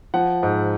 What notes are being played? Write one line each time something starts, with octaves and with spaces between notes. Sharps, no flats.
F3 F#5
G#2